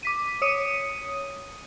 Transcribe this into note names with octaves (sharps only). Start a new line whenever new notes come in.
D6 B6 D#7
C#5 D#6 C#7 D#7